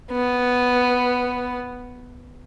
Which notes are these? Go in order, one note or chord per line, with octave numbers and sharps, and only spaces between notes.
B3